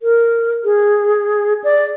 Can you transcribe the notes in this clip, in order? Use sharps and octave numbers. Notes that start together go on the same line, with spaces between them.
A#4
G#4
D5